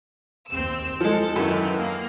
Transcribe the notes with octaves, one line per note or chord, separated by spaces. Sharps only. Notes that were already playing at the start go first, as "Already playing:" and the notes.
D#2 C4 E6
F3 G#3 A4
F#2 D#3 E3
A#3